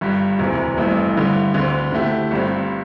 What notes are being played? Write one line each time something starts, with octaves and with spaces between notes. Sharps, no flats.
G1 G2 G3
E1 D2 C3 E3
A1 G2 E3 A3 C4
G2 D3 G3 E4
D2 D3 C4
D3 A3 E4 G4
G1 G2 G3 C4